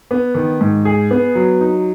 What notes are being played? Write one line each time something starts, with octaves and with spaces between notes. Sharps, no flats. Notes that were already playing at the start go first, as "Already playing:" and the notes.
B3
D#3
G#2
G#4
B3
F#3
D#4